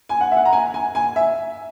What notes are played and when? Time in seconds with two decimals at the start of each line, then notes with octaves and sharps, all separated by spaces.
0.09 G#5
0.21 F#5
0.31 E5
0.37 F#5
0.45 A#5
0.53 G#5
0.74 G#5
0.95 G#5
1.16 E5